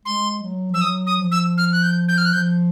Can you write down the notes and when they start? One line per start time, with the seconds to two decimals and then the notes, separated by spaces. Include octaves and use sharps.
0.05 G#3 C6
0.42 F#3
0.71 F3 E6
0.81 F#3 D#6
1.07 D#6
1.19 F3
1.31 E6
1.57 F6
1.72 F#6
1.83 G6
2.08 G6
2.18 F6
2.25 F#6
2.33 F3 G6